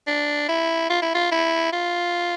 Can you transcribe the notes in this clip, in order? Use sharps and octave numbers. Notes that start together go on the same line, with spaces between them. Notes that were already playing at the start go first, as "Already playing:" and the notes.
D4
E4
F4
E4
F4
E4
F4